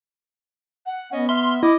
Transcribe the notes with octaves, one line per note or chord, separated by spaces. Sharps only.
F#5
B3 C#4 D#5
E5 C6 F6
E4 D#5 D6